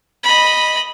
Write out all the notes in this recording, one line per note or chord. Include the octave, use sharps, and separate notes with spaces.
D#5 B5